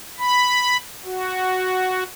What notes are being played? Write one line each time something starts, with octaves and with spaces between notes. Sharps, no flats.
B5
F#4